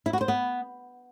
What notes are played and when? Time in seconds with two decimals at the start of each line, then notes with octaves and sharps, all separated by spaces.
0.06 E4
0.13 F#4
0.21 C5
0.28 B3